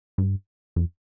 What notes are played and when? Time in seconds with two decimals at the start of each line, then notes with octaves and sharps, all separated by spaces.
0.18 G2
0.76 F2